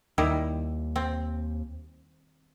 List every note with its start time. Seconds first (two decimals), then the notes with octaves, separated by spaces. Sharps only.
0.18 D#2 D#3 G3 E4
0.96 C4